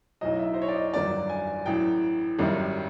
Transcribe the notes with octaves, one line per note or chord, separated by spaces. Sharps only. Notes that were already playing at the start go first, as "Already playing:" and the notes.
B1 A2 F#3 D#5
E5
C5
C#5
D5
D#5
G1 G2 D#3 F#3 D5
G#5
A1 A2 F#3 G5
G#1 F#2 D#3 G3